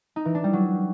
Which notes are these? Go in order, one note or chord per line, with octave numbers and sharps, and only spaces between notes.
D#4
E3
D4
G3
F#3